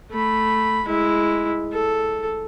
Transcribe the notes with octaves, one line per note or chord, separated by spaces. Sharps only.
A3 B5
G#3 E4
A4